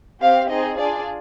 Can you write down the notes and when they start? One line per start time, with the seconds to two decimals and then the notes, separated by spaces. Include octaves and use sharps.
0.20 C4 G4 F5
0.49 C4 D#4 G#4 D#5
0.78 D4 F4 G#4 D5